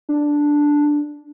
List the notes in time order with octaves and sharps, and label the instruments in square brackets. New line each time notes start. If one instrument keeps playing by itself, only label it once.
[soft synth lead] D4